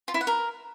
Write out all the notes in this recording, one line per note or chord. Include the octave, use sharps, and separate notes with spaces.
F4
E4
F#5
A#4